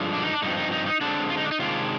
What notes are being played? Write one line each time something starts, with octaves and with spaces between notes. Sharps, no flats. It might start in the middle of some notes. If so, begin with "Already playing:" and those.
Already playing: G2 D3 F3 G#3
D4
D#4
D4
G2 F3 C4 D#4
D#4
D#4
D#4
D3 G#3 C4 D4
F4
D#4
D4
D#4
C3 D#3 G#3 D4 F4